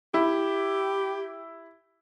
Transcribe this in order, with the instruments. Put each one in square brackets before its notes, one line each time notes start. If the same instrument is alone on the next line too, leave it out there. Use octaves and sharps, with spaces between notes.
[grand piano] E4 [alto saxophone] G4